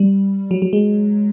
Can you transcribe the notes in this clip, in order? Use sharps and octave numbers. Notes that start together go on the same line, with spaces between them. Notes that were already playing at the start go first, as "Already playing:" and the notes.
Already playing: G3
F#3
F#3
G#3